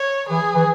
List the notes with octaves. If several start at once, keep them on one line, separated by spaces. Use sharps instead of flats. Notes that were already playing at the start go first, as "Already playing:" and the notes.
Already playing: C#5
E3 G#4
E3